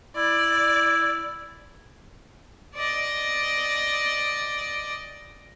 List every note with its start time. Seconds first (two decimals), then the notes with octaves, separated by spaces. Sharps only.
0.16 E4 D5
2.75 D5 D#5